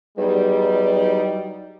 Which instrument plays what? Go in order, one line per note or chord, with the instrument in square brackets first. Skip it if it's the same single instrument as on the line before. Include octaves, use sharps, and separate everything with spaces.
[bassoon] E2 [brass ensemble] F#3 G3 D#4